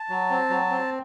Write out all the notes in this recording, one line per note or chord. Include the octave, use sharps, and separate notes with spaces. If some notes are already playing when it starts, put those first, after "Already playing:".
Already playing: A5
F#3
C4
F#3
C4